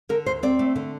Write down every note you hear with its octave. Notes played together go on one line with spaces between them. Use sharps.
D3 A#4
D2 C5
C4 D5
A3
D3